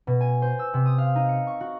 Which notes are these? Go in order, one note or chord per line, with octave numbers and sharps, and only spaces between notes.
B2
G#5
C5
E6
C3
D#6
F5
D#4
C#7
C#6
F#4